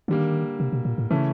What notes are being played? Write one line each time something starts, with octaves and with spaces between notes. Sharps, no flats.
D3 D#3 G3 A#3
C3
B2
A#2
A2
C#3 E3 A3 C#4